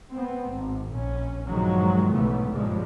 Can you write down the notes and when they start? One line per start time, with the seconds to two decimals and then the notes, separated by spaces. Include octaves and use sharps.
0.13 B3 C4
0.49 G#1
0.91 A#1 C#4
1.49 G2 A#2 D#3 F3 F#3 G#3
2.11 B1 G#2 C#3 E3 A3 B3
2.53 G2 A#2 C#3 F3 G3 G#3